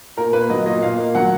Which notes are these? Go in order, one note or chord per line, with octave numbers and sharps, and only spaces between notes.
A#2 A#4
A#3 B4
F#3 D#5
A#2 D#5
A#2 F5
A#3
F#3 F#5